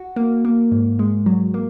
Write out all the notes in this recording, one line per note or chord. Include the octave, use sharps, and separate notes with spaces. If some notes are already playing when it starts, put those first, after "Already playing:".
Already playing: F#4
A#3
A#3
G#2
G#3
F#3
A#3